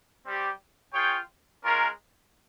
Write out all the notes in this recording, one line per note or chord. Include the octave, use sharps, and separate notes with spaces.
G3 C4 G4
F4 G#4 C#5 G5
G#3 C#4 F4 A#4